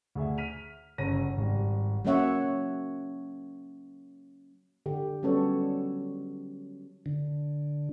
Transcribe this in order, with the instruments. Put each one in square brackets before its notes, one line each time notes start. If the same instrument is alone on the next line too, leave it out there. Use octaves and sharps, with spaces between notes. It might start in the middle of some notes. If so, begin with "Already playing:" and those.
[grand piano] D2 G#4 E5
F6 B6 D#7 F7
G1 C#3 C#4 A#5 A#6 D#7
G#1 G3
[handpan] F#3 A#3 C#4 C#5 E5 F#5
D3 G4
F#3 G3 B3 C#4 A4 C#5
[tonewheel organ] D3